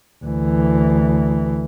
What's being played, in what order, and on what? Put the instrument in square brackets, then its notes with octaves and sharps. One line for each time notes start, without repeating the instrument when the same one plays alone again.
[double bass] D2 E3